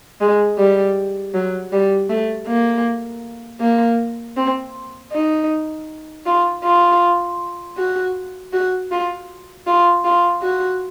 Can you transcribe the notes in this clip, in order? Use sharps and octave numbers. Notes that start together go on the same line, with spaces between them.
G#3
G3
F#3
G3
A3
A#3
A#3
C4
D#4
F4
F4
F#4
F#4
F4
F4
F4
F#4